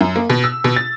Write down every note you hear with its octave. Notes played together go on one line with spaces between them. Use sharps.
F#2
A#3
B2
E6
B2
A6